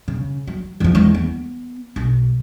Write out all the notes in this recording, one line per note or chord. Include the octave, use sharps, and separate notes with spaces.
C#3
F#3
E2 F3
E2 G#3
B3
B1